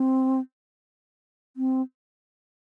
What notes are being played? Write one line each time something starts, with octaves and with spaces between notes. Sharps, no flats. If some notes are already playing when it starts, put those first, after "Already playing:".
Already playing: C4
C4